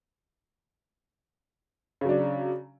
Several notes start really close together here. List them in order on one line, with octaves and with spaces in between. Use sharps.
C#3 F#3 D4